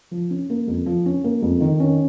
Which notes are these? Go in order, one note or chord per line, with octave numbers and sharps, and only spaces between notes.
F3
C#4
A#3
F2
F3
C#4
A#3
F2
D#3
C#4